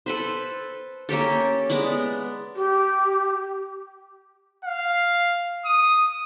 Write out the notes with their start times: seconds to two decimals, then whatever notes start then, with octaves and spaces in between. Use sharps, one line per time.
0.06 A4 B4 C5
1.09 A#3 C#4 G4 A4
1.70 G#3 B3 D5
2.56 G4
4.65 F5
5.65 D#6